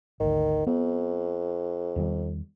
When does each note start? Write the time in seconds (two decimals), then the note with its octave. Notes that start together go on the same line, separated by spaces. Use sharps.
0.20 G#1 D2 D#3
0.67 F2 B3
1.96 E2 D#3 G3